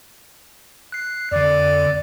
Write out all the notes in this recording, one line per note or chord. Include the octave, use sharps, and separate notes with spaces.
F#6 C7
F2 D3 D5